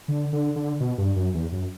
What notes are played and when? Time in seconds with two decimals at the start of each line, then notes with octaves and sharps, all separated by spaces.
0.08 D3
0.33 D3
0.56 D3
0.80 B2
0.98 G2
1.16 F#2
1.34 E2
1.52 F#2